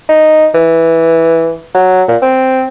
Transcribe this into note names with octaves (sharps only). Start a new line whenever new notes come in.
D#4
E3
F#3
A#2
C4